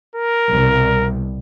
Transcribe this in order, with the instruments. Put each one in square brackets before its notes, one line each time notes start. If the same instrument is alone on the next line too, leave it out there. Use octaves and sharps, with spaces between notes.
[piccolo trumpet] A#4
[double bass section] C2 B2